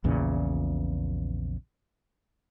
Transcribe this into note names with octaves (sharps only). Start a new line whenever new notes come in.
A#1 E2 A#2 C#3